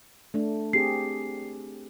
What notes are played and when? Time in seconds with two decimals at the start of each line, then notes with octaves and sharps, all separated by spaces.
0.34 A3 D4
0.73 C4 G4 G#4 C7